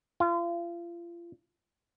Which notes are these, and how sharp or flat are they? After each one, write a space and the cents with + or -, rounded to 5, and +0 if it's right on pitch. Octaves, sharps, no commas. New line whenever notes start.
F4 -35